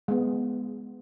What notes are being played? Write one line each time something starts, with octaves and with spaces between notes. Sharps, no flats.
G#3 B3